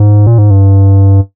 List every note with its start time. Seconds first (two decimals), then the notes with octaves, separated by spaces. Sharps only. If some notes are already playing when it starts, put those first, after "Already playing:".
Already playing: G#2
0.27 A#2
0.38 G#2
0.51 G2